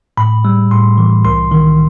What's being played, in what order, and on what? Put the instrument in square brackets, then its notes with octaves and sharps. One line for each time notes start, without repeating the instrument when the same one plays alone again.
[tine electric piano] A2 B5
G3
A2 C6
E3
C2 C6
D#3